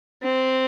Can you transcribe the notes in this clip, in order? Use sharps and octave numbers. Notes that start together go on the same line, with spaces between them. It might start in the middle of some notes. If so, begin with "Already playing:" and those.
C4